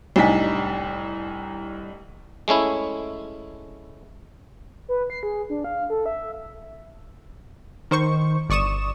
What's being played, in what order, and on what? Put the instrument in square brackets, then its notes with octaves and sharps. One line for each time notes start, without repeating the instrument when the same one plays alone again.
[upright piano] C2 A2 D4 D#4 G#5 B6
[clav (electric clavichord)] G#3 A3 C#4 E4
[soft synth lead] B4
C7
G#4
D4
F5
A4
E5
[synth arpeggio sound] D#3 C5 C#6
G1 D5 C#6 D#6 E7